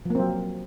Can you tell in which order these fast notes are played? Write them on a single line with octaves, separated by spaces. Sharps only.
F3 A#3 C4 F#3